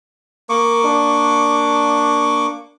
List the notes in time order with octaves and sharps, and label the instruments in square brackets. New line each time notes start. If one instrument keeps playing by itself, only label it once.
[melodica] A#3 C#6 D6 [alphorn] A#4
[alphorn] D4